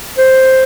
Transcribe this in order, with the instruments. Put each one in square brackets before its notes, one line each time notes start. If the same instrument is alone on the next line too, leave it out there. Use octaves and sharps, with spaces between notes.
[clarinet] C5